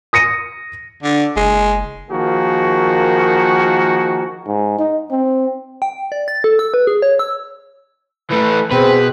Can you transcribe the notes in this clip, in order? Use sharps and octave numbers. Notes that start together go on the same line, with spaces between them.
D#6 A#6 C#7 D#7
D3
F#1 G#3
D#3 F3 A#3 F#4 G#4
G#2
D#4
C4
G5
D5
A6
A4
E6
B4
G#4
C#5
E6
E3 A3 B4
B2 C4 G#4 B4